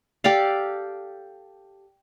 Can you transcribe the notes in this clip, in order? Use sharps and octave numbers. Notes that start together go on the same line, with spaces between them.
G4 A4 D5 F5